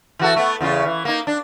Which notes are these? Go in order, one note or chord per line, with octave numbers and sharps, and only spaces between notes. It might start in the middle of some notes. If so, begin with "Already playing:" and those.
E3 F#4 A4
A3 B3
E2 C#3 F4
E3
A#3 D#4
D4